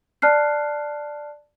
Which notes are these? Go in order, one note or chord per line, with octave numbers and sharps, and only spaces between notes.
D5 A5 F6 F#6 C7